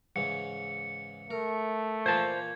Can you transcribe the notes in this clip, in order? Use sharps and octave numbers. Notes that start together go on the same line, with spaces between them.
G#2 C#3 E3 C#7
A3 A#4
A#2 E3 A#3 C5 A5 G#6